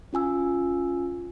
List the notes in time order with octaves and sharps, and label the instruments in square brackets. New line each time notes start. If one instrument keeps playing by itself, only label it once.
[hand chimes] C#4 F4 G#5 E6